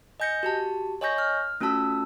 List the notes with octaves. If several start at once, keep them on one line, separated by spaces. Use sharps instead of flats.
D#5 G#5 G6 A#6 C#7
F#4 G4 A5
C#5 D#5 G#5 C#6 G6 A#6
F6
A3 C#4 F4 F#4 A5 E6